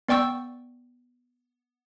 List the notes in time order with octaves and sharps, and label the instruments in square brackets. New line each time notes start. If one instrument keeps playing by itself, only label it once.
[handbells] B3 D5 G5 C#6 E6